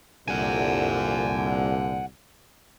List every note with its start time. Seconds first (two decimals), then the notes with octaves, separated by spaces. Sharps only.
0.28 C2 A#2 D3 F#5 G#5